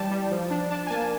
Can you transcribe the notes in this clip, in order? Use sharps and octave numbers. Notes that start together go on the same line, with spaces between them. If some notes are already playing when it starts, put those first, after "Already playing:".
Already playing: E3 G3 G5 A5
G3
F3
D4
D4 A5
G#5
A#3 A5